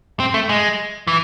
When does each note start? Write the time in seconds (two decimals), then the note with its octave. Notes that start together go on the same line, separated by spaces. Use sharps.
0.20 C4
0.34 A3
0.49 G#3
1.07 E3